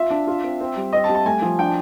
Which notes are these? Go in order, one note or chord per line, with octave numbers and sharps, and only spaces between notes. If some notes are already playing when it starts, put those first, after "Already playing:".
Already playing: F4 E5
D4
F4
C4
C4
G3
C4 D#5
A5
G3
A5
A3 G#5
F3
D4 G5